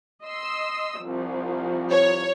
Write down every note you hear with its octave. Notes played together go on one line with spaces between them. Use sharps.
D#5 C6 E6
C2 F3
C#5